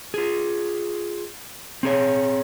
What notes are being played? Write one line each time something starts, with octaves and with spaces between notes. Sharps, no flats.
F4 G#4
C4 G#4 C#5